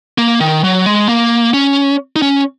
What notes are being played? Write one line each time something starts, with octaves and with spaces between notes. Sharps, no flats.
A#3
D#3
F#3
G#3
A#3
C#4
D#4
C#4